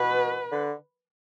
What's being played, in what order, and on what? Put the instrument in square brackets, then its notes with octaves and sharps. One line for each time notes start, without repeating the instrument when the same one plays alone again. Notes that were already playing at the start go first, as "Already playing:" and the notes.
Already playing: [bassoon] B2 [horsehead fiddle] B4
[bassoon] D3